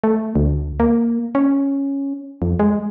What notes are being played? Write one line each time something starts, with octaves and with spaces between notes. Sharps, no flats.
A3
D2
A#3
C#4
F2
G#3